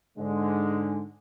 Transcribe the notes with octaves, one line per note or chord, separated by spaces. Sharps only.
G#2 D3 G#3